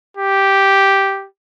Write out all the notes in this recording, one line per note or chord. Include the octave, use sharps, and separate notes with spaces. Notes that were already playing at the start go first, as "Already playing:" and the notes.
G4